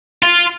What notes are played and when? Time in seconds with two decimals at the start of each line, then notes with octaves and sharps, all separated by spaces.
0.23 F4